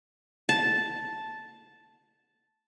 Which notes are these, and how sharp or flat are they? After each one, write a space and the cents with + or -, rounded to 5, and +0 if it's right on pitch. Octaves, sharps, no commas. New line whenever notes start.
A5 -5